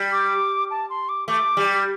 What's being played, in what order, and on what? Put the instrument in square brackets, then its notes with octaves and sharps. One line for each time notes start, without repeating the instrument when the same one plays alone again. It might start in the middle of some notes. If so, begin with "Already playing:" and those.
Already playing: [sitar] G3
[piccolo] D6
A5
C6
D6
[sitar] A3 [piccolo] D6
[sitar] G3